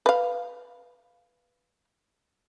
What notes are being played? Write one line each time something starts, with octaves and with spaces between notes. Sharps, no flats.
B4 F5